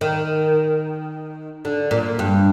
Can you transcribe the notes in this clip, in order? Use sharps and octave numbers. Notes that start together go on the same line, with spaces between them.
D#3
D3
A#2
G2